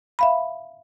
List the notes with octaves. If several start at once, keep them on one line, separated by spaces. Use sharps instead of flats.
E5 F5 B5